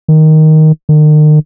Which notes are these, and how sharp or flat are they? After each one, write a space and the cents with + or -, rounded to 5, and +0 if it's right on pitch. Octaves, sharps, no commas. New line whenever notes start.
D#3 +5
D#3 -40